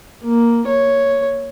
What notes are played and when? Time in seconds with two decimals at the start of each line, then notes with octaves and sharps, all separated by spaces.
0.23 A#3
0.67 C#5